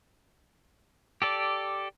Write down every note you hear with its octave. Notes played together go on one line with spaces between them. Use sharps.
G4 A4 D5